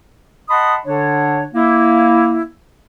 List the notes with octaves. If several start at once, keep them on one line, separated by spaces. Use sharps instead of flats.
D#5 F#5 A5 B5 C6 D#6
D3 D4 C#5
A#3 E4